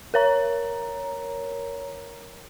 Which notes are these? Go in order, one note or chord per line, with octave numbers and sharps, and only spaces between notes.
A#4 C#5 A#5